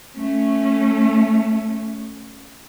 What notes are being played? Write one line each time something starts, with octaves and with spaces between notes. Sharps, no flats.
A3 C#4